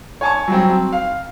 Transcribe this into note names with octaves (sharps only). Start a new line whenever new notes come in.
C#5 G#5 A5 C#6
F#3 G3 C4
F5